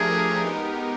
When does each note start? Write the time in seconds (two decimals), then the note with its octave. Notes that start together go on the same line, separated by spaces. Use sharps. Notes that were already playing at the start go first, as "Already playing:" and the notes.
Already playing: F3 A3 D4 G4 G#4 A#4
0.42 G#3 B3 D#4 G4 A#4